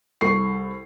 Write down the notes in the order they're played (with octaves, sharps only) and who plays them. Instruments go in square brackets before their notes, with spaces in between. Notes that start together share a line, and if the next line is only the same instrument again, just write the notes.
[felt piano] C2 A4 C#6 C7